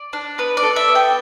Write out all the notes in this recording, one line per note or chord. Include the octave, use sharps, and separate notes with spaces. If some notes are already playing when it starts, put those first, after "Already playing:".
Already playing: D5
D4
B3 B4
D5
A4
E5
B3
G5